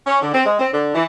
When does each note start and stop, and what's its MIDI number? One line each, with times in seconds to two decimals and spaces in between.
0.05 0.19 61
0.21 0.29 50
0.33 0.45 60
0.45 0.54 56
0.59 0.67 60
0.72 0.91 50
0.94 1.04 52